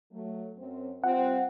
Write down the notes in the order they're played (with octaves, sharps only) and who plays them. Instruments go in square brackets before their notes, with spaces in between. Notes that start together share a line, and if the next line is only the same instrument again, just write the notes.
[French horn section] F#3 A3
F#2 C4
[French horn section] G3 C4 F4 [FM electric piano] F#5